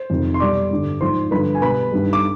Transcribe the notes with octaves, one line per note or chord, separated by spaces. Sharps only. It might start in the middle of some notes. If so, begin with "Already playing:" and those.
Already playing: C5
F2 C3 D#3
C6
B2 G3 D5 D6
G2 D3 G3
G#2 F3 C5 C6
G2 D3 F3 B4 B5
G#5
B2 G3 B4 B5
G2 D#3 G3
D6